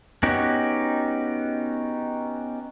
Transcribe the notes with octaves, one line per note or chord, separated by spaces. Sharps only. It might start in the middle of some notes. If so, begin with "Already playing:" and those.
B3 C#4 D#4 F#4 G4